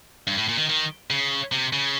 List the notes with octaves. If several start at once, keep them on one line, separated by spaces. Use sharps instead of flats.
G2
A2
A#2
D#3
D#3
C#3
C3
C#3